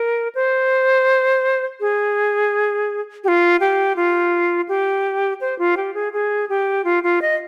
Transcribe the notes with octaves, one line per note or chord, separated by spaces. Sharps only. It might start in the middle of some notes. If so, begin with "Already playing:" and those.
Already playing: A#4
C5
G#4
G4
F4
G4
F4
G4
C5
F4
G4
G#4
G#4
G4
F4
F4
D#5